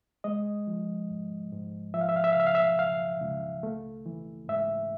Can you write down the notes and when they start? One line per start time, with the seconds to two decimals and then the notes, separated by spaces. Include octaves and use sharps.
0.24 G#3 D#5
0.67 F3
1.10 G#2
1.52 G#2
1.94 F3 E5
2.01 F5
2.09 E5
2.16 F5
2.24 E5
2.32 F5
2.36 C#3 E5
2.47 F5
2.55 E5
2.79 C#2 F5
3.22 C#2
3.63 A3
4.06 E3
4.48 G#2 E5